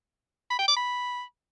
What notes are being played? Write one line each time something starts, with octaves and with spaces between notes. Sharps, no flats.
B5
G5
D6
B5